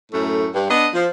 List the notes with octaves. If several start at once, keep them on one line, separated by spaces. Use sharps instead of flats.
F#2 A2 A3
G2
B3 D4 D#5
F3